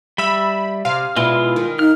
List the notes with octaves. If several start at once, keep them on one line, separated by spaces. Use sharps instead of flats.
G3 E5 B5
C3 F5
B2 G#3 E4 F4
D#3
D#4 F6